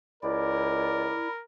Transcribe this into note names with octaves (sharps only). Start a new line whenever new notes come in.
C#2 E4 A#4 D5